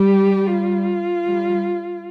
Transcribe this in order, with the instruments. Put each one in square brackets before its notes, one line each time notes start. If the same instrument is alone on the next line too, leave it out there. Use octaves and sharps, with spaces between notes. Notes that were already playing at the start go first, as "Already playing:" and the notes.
Already playing: [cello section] G3 [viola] G4
[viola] F4
[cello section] G3